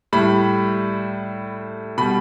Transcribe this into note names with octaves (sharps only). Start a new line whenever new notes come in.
A2 G3 B5
B2 G3 B5